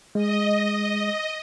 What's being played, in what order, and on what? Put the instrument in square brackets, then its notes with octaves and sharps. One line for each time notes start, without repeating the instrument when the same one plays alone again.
[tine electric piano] G#3 [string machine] D#5